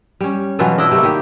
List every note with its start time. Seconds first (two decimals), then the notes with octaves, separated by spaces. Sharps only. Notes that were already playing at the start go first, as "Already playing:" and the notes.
0.21 G3 C#4
0.59 B2 E3 F#3 F4
0.78 D4 E4 D#5
0.92 C3 A3 A#3
1.03 D#3 G4